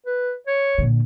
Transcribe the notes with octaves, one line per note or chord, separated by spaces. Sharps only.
B4
C#5
A#2 D3